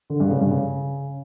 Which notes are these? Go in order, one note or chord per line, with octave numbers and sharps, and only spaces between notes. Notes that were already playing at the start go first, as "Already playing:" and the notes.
D3
G2
C#3
G2
C#3